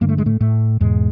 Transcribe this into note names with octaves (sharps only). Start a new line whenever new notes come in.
G2 D3 A#3
A3
G#3
A2 A3
A2 A3
E2 G#2 B2 G#3